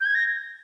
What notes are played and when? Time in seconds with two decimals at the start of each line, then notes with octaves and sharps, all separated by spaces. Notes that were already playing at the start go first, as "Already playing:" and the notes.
0.01 G6
0.06 G#6
0.15 A#6